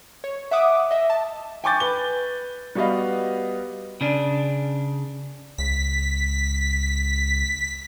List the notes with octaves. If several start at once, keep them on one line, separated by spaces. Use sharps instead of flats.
C#5
E5 F#5 D6 D#6
D#5 E5
A5
G5 G#5 C#6 D6 G6 A6
B4 G7
G3 B3 F#4 B4 D#5 F5
C#3 D4
C#2 B6